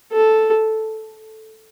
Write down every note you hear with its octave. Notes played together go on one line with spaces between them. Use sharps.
A4